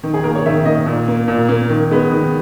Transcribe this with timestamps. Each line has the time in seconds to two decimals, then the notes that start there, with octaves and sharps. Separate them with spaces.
0.03 D#3
0.14 G#4
0.24 A#3 A#4
0.35 C#5
0.46 D#3 E5
0.65 A#3 D#5
0.86 A#2
1.08 A#3
1.28 A#2
1.49 A#3
1.70 D#3
1.91 G#3 B3
2.11 D#3